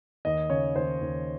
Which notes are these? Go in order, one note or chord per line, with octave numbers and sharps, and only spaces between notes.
D#2 D#5
C#3 C#5
D#2 C5
D#2